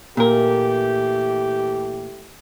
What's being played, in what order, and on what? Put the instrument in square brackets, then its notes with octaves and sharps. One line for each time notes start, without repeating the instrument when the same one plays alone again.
[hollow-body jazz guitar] A#2 A#4 [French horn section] E3 A3 G4